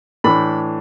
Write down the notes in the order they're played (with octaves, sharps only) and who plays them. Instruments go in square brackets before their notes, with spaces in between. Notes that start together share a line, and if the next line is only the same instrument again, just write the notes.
[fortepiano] A2 E3 A3 D4 B5